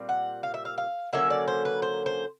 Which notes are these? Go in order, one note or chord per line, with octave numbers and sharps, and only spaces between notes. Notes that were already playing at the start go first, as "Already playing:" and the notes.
Already playing: A#2 G3 C4
F#5
F5
E5
F5
F5
D3 F#3 A#3 C#4 E5
D5
C5
B4
C5
C5